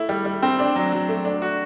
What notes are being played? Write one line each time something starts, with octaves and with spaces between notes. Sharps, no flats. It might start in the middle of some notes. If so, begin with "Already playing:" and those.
Already playing: A3 E4
G3
G3
C4
D4
F#3
F#3
A3
D4
F#4